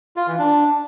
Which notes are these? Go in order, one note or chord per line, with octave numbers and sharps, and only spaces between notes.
F4
E3
D4